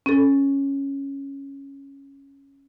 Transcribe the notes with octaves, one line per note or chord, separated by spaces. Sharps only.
C#4 A4